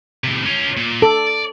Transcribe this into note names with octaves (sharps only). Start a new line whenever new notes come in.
A2 C3
C#4 F4
A#2
A4 D5